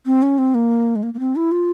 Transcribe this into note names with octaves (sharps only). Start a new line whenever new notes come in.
C4
C#4
C4
A#3
G#3
A#3
A#3
C4
E4
F4